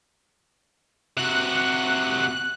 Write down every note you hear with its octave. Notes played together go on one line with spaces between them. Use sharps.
C3 F#4 F#6